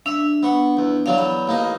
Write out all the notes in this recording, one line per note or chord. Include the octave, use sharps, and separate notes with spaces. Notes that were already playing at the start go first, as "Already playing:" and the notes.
D4 E5
B3 C#6
E2
E2 F#3 D4 F5
B5
A1 A#3 D#4